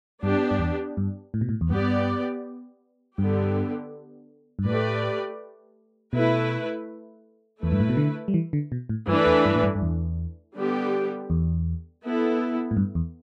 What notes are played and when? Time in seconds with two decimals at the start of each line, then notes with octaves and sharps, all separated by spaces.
0.23 G2 B3 D4 G4
0.51 G2
0.59 E2
0.97 G2
1.34 A2
1.41 B2
1.49 A2
1.61 E2
1.70 G2 B3 G4 D5
3.18 G2 D3 B3 G4
4.59 G2
4.65 A2 A3 G4 B4 D5
6.13 B2 A3 E4 B4
7.60 E2 A3 E4 B4
7.72 G2
7.80 A2
7.89 B2
7.97 D3
8.28 G3
8.34 E3
8.53 D3
8.72 B2
8.89 A2
9.08 G2 E3 A3 D4 B4
9.26 E2
9.45 G2
9.56 A2
9.63 G2
9.75 G2
9.82 E2
10.56 D3 G3 B3 G4
11.30 E2
12.03 B3 E4 A4
12.71 A2
12.77 G2
12.95 E2